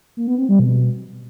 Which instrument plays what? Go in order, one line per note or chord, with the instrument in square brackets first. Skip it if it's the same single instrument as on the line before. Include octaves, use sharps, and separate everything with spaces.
[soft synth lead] A#3
B3
C4
G3
B2